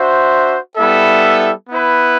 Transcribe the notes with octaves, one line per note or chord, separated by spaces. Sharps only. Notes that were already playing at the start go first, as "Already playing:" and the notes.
Already playing: D4 F#4 C5 E5
G3 B3 E4 A4 E5
B3 E4 B4